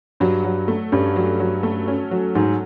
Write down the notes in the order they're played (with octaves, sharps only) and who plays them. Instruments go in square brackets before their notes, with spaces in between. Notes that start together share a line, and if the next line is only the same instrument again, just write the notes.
[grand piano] G2 [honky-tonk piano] F#3
[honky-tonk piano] F#3
A3
[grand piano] G2 [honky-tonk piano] C#4
[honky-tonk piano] F#3
F#3
A3
C#4
F#3
[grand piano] G#2 [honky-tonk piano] F#3